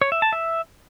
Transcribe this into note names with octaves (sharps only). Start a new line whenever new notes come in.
C#5
E5
A5
E5